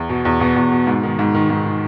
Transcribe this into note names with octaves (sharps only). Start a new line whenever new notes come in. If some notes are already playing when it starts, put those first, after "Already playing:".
Already playing: E2
B2
E2
B2 B3
E2
B2
G#2
D#3
G#2
D#3
G#2
D#3